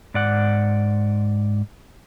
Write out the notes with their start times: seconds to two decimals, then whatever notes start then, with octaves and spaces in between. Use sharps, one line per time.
0.14 G#2 D5 F#5